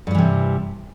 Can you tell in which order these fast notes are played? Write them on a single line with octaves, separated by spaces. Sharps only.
G2 G3 E3 C3